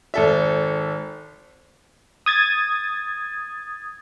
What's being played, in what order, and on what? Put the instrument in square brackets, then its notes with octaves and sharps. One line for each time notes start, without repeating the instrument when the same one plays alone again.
[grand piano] G#1 A4 E5
[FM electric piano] D#6 G#6 A6